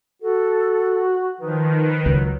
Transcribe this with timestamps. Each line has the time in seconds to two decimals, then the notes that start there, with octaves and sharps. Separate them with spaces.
0.22 F#4 A4
1.40 D#3 F3 B4
2.06 C#2 F#3